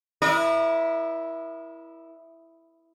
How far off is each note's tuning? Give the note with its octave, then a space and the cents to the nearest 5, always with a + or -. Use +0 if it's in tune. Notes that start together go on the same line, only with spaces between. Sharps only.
E4 +0 A#4 +45 D#5 -45